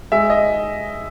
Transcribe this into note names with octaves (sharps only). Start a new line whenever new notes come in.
G#3 E5
D#5